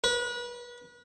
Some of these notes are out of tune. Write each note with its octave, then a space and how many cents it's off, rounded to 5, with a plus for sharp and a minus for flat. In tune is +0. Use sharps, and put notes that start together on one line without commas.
B4 -35